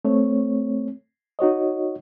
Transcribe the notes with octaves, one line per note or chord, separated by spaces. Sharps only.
A3 C4 C#5
D#4 F#4 C#5 D#5